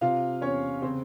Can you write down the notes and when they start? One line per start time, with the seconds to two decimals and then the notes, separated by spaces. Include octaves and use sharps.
0.01 C3 F4 F5
0.41 E2 C#4 C#5
0.82 C#3 C4 C5